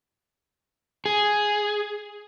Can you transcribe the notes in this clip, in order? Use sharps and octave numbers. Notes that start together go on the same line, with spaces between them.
G#4